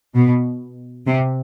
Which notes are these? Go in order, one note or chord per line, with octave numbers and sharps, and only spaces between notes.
B2
C3